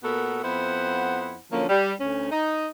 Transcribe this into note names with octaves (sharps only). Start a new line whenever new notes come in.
A#2 B3 F#4 A4 A#4
F2 B3 E4 C5 F#5
D3 F3 F#3 A#3 C#4
G3
D2 C#4
D#4 D#5